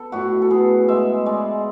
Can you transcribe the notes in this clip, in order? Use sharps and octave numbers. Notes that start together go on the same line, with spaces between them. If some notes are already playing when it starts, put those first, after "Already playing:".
Already playing: B3 A4
A2 F#4
A4
B3 G#4
G#3 E5
G#3 D5